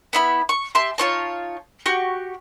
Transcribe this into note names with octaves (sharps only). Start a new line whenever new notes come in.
B3 E4 B5
C#6
G4 E5 A5 C6
D#4 F4 C#5 A5
F#4 G4 C#6